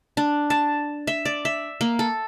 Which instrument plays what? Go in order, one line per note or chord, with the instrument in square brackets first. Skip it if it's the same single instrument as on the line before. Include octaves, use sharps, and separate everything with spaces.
[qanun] D4
A5
E5
D5
E5
A#3
A4